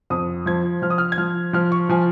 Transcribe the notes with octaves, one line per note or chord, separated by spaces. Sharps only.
F2 D#6
F3 G#6
F3 F6
D#6
F6
G#6
F3 F6
F3 F6
C#6
F3 G#5